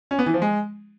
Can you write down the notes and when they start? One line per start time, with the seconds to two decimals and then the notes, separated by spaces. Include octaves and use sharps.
0.11 C#4
0.19 B3
0.26 E3
0.34 F3
0.42 G#3